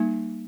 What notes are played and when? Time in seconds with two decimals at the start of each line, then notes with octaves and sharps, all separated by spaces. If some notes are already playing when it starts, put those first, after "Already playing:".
Already playing: G3 A#3 D#4